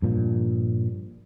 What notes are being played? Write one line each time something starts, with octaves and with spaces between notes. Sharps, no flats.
G2 A#2 F3